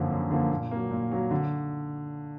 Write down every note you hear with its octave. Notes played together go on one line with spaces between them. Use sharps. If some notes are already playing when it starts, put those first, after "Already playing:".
Already playing: F#2 D3 F3 A#3
F#2
D3 F3 A#3
A#2
F#3 A#3
A#2
F#3 A#3
D3